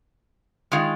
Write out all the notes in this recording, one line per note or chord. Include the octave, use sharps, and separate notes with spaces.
D#3 G#3 F4